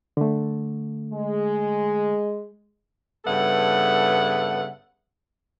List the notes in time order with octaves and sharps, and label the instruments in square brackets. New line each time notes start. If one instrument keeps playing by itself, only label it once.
[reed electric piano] D3 A3
[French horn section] G#3
[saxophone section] G2 C#3 B3 A4 E5 F#5